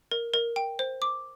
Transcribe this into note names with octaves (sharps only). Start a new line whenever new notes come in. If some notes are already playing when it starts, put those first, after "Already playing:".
A#4
A#4
G5
C5
D6